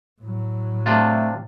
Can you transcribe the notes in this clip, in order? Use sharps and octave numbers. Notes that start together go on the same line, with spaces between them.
A2 F#3
C3 A3 D4 F4